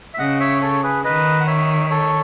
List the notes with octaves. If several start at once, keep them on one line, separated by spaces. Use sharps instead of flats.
E5
C#3 D#5 F#5
C#5 E5
A4 C#5
G#4 B4
D#3 B4 D#5
F#5
C#5 E5
A4 C#5